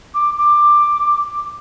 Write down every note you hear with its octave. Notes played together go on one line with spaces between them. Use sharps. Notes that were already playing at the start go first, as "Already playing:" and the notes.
D6
D6